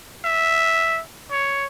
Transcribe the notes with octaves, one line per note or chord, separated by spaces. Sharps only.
E5
C#5